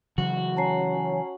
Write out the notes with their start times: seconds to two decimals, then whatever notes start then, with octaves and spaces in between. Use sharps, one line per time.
0.18 C#3 E3 F#3 F#4
0.57 C#4 A5 A#5 C7